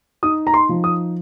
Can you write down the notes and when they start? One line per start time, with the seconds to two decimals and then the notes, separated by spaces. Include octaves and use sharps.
0.23 D#4 D#6
0.47 A#5
0.54 C6
0.69 F3
0.84 D#6